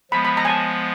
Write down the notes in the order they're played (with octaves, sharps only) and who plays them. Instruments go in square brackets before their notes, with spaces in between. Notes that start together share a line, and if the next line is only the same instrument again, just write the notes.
[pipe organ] F3 G#3 B3 [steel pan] B5
[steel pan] B5
A#5
G#5
A5